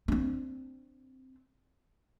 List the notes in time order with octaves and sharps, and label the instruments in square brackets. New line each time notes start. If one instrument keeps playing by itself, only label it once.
[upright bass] C4 D4